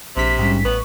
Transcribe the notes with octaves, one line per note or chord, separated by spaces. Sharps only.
A#1 C3 B6
G#2 G3 C#4
A1 B3 C#6